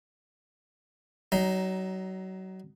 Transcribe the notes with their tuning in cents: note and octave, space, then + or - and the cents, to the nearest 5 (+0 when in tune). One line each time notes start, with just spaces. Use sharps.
F#3 +30 D#4 +0